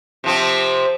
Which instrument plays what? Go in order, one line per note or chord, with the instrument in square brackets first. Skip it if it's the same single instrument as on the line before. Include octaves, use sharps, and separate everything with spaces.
[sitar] C3 F3 C4